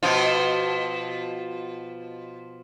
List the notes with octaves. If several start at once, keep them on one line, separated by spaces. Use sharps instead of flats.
B2 F3 F4